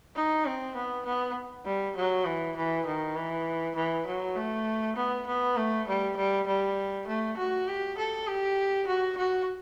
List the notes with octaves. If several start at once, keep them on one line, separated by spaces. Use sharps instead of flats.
D#4
C4
B3
B3
G3
F#3
E3
E3
D#3
E3
E3
F#3
A3
B3
B3
A3
G3
G3
G3
A3
F#4
G4
A4
G4
F#4
F#4